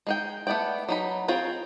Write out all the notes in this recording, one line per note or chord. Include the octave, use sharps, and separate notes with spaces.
G#3 D#4 G5
A3 B3 E4 D5 G5
F#3 D#4 B5
C4 F4 G#4 C#5 G5